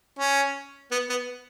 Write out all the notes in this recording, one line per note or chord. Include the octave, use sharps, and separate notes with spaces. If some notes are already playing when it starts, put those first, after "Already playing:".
C#4
B3
B3